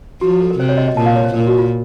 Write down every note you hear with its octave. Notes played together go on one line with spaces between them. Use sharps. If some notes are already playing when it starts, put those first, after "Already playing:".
F3 F#4
F#4
A4
A#4
C3 C5
C#5
D#5
D#5
A#2 A5
F5
C#5
C5
A#2 A#4
F#4
F4